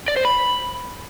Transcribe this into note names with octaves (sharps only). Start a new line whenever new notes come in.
D5
C5
B5